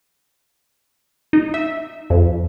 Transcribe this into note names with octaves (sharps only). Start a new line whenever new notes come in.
D#4
E5
F2